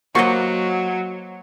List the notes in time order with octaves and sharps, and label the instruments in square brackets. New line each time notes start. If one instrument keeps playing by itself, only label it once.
[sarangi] F#3 [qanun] A#3 B4 D#5 [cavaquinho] F#4 C5 C#6